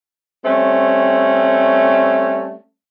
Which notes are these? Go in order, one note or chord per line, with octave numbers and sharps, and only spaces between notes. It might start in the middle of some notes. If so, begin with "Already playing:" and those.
G3 A3 C4 C#4